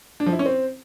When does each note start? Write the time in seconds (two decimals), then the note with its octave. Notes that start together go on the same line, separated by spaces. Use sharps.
0.20 D4
0.26 F3
0.33 E4
0.39 C#4
0.46 C4